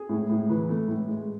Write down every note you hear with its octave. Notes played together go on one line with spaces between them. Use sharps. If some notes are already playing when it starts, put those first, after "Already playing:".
Already playing: G#4
A2
A2
E3 B4
A3
A2
G#3